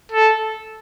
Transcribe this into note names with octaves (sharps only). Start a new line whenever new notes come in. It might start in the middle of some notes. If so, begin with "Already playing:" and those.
A4